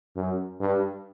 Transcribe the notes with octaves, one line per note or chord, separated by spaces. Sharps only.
F#2
G2